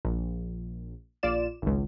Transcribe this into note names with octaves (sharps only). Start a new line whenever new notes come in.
A#1
A#1 F4 D5 E7
G#1 C#2